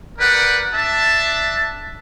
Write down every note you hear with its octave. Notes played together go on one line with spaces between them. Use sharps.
G4 A#4 B4 D5 F#5
D4 E5 A5